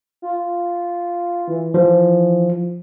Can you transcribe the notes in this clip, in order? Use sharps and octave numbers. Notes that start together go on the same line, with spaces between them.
F4
E3
F3